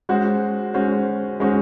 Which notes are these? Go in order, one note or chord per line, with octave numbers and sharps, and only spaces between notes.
G#3 C#4 F#4 C5
G#3 C#4 F#4 C5
G#3 C#4 F#4 C5